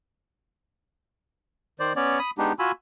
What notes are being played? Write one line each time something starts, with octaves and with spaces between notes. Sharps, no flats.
D#3 C5 D5
B3 C#4 C#5 D5
B5 D#6
G#3 B3 D4 D#4 G4
F4 F#4 G#5 B5 E6